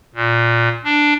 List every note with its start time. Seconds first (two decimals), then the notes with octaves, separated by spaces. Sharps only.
0.15 A#2
0.84 D4